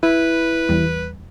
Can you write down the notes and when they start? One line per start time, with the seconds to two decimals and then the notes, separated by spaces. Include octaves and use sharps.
0.03 E4 B4
0.69 E2 G3